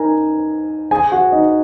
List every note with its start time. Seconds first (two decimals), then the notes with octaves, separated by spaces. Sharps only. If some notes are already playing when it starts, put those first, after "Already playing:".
Already playing: D#4 A#4 G#5 A#5
0.91 G#4 G#5
1.12 F#4 F#5
1.32 D#4 D#5